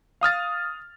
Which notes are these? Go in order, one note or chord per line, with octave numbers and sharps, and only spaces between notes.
F5 D#6 F6 A6